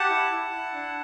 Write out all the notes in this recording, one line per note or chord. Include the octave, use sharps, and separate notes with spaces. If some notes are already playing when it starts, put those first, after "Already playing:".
Already playing: G4 F#5 A5
E4
E4
E4
D4